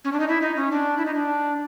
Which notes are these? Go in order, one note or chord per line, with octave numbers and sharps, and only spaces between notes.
C#4
D4
D#4
E4
D#4
C#4
D4
E4
D#4
D4